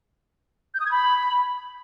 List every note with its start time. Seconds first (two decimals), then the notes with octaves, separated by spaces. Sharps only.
0.74 G6
0.80 D#6
0.86 G#6
0.91 B5